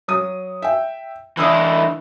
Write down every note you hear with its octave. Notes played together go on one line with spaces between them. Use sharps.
F#3 D#6 D#7
E5 G5
E3 D4 E4 D#6 E6 F#6